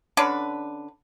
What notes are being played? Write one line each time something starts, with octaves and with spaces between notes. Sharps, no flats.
D3 C#4 D4 B4